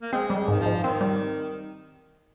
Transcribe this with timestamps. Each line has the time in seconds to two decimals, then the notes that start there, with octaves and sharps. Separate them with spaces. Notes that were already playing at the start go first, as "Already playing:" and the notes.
0.02 A#3
0.12 G#3 C4
0.30 G3
0.36 G#3
0.48 G#2 D#3
0.60 F3
0.66 G#2
0.83 D#3 C4
1.01 G3